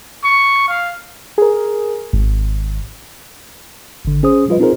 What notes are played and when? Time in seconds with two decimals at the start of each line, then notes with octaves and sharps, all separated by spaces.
0.24 C#6
0.68 F5
1.38 G#4 A#4
2.13 G#1
4.05 G#1 D3
4.23 C#4 G#4 C5 D#6
4.48 F3 G3 F4 B4 D#5
4.60 C4 D#4 F4 G#4 A#4 C5